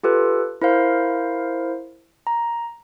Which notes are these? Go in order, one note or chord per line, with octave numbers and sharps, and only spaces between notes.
F4 G4 A4 B4
E4 A#4 C5 F5
A#5